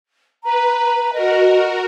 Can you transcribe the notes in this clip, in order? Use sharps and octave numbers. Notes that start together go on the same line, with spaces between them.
B4 A#5
F#4 A#4 D#5